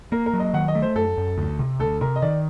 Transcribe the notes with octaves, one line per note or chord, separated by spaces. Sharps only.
A#3 A#4
A#4
F#3
D#5
D#3 F#5
D#5
A3
C5
F#2 A4
F#2
D2
C3
D2 A4
C3 A#4
D#5
D#3 D5